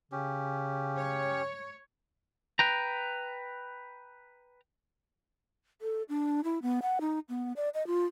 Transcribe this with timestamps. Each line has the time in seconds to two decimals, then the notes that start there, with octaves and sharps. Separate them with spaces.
0.12 C#3 C#4 G4
0.97 C#5
2.59 B4 G5 A#5
5.82 A4
6.09 D4
6.44 E4
6.62 B3
6.82 F#5
7.01 D#4
7.29 B3
7.56 D5
7.74 D#5
7.87 F4